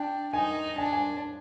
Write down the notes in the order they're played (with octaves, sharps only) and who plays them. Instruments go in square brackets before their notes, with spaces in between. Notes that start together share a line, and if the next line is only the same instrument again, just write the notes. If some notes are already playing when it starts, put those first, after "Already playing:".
Already playing: [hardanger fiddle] D4 [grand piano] G5
[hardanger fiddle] D#4 [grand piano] G#5
[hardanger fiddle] D4 [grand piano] G#5
[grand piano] G#5